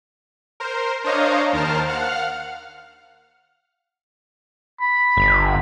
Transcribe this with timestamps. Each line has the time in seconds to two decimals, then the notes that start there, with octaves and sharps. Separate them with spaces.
0.60 A#4 C5
1.04 D4 C5 C#5 D#5 F5 A#5
1.53 D#2 D#3 A#4 C5 A5 F6
1.87 F5 F#5 F6
4.81 B5
5.17 G1